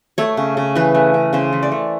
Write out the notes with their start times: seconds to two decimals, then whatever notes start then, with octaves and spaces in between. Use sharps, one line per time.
0.18 A3 C#5
0.37 C#3
0.57 C#3
0.75 E3 B4
0.95 A3
1.14 C#3
1.33 C#3 C5
1.53 E3
1.63 D5
1.72 A3